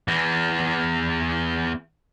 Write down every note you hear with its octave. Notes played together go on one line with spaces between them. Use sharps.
E2 E3